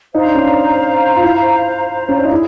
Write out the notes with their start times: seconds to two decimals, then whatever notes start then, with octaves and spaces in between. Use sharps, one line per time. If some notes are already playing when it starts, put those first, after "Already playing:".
0.13 D#4 C5 F5 A#5
0.24 D4
0.35 C#4
0.45 D4
1.16 F4
1.23 E4
2.09 C#4
2.17 D4
2.24 D#4
2.31 E4 G#4